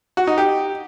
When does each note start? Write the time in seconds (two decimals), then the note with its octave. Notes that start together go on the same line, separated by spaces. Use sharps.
0.17 F#4
0.27 D#4
0.38 G4